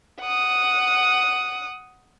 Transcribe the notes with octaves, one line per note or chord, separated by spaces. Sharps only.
F#5 D#6